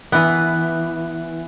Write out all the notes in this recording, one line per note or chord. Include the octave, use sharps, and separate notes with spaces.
E3 B3